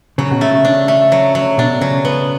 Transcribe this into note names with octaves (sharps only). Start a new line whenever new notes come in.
C#3 F#3
B2
C#3 A3
D4
A3
F#3
F#3
B2 D4
C#3 F#3
B3